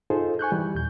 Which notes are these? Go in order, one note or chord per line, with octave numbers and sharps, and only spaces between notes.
D#4 F4 G#4 A4 C5
G#5 C#6 F#6 G6
E3 G3
D#2 A#2 G6